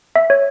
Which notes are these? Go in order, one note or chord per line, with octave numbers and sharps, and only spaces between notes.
E5
C#5